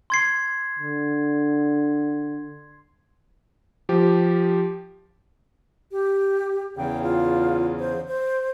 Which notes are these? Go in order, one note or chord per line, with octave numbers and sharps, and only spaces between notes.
C6 G#6 C7
D3
F3 G4
G4
E2 C#3 G5
F4
C5
C5